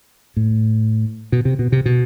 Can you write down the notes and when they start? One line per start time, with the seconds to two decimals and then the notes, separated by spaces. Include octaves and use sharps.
0.37 A2
1.32 B2
1.45 C3
1.59 B2
1.72 C3
1.86 B2